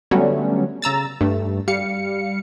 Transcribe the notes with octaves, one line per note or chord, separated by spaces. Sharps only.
D3 F#3 G3 A3 B3 C#4
C#3 A#5 E6 A6
G2 A3
G3 F5 C#7